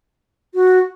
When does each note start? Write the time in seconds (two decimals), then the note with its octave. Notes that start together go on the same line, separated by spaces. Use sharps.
0.55 F#4